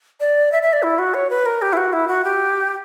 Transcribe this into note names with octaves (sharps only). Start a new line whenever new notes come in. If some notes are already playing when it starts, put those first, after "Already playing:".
D5
E5
E5
D5
E4
F#4
C#5
B4
A#4
G4
E4
F#4
E4
F#4
G4